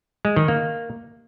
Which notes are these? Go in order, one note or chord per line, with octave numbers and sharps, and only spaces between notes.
G#3
D#3
A#3